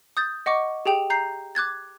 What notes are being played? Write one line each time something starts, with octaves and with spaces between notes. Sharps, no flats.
D#6 G6 A6
D#5 F#5 C#6 D6
G4 G#4 G5 F7
A#5 G6 C7
D6 F#6 G#6 A6